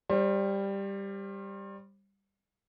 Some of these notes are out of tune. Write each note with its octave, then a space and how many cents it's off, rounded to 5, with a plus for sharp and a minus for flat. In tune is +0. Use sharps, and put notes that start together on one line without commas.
G3 +10 C5 +40